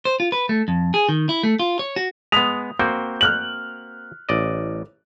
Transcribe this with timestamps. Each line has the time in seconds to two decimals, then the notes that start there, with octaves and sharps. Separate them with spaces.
0.05 C5
0.20 F4
0.32 B4
0.49 A3
0.68 F2
0.94 G#4
1.09 D#3
1.29 E4
1.43 A3
1.59 F4
1.79 C#5
1.96 F#4
2.32 G#3 B3 D#6 B6 F7
2.79 A#3 C4 F#4 G6
3.21 F6 F#6 F#7
4.29 A1 D5 D#5